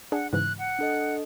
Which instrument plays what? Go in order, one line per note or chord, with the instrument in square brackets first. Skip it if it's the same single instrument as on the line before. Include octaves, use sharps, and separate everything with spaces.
[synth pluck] D4 G#4 [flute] F#5
[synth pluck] G#2 C#3 E3 [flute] F#6
[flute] F#5
[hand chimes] D4 A4 D#5